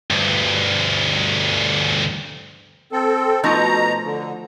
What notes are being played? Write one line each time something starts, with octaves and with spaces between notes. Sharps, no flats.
D2 G2
C4 A4
B2 F3 A3 D#4 A#5
D3